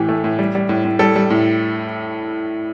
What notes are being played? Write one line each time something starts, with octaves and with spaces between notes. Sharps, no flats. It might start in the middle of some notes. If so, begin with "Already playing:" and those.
Already playing: A2 E3 G4
A3
A2
G3
G3
A2
A2
G3 A4
G3
A2